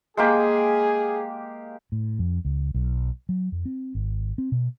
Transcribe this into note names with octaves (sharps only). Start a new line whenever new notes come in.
G#3 A#3 G4 G#4
A2
F2
C#2
B1
F#3
F2
C4
G#1
C4
B2